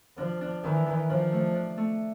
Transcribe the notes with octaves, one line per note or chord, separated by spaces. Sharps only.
F3 D4
D4
D#3 E3
D#3
F3 D4
A3
D4
A3